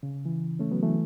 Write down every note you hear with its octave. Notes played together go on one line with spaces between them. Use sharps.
C#3
E3
A3 C#4
F#3 B3
E3 A3